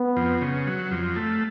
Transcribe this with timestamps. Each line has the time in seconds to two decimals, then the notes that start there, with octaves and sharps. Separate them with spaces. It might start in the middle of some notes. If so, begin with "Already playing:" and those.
Already playing: B3
0.16 F2
0.41 C#3
0.67 F#3
0.91 F2
1.16 A3